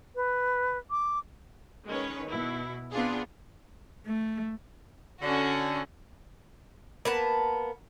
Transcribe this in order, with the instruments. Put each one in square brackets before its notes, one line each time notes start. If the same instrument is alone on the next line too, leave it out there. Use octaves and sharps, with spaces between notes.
[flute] B4
D6
[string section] D#3 G#3 C#4 B4 C#5
B2 E4
B3 C4 D4 F4 G#4
[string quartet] A3
[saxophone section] D3 [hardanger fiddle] C#4 F#4
[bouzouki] A#3 B3 A5